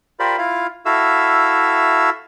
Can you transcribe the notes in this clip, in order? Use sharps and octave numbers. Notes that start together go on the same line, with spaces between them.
F4 G4 A#4 C5 D5 B5
E4 F4 F5
E4 F#4 A4 E5 F5 E6